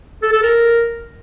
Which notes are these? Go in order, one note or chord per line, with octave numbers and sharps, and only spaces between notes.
A4
A4
A#4